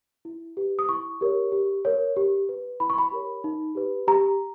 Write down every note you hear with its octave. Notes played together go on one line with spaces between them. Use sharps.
E4
G4 B4
D#6
E4 C#6
G4 A#4 C#5
G4
A#4 C#5
G4
B4
E4 B5
C#6
B5
G4 A#4 C#5
D#4
G4 B4
G4 A#5